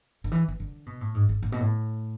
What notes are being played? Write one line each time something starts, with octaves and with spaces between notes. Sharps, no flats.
D3
E3
E3
D3
B2
A2
G#2
G#2
A2
B2
A2